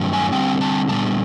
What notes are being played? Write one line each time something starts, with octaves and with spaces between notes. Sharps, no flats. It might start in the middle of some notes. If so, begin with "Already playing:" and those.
Already playing: G2 D#3 F#3 A3 C#4
G#5
D3 G3 C4 G5
A5
A#2 G3 B3 D4 A5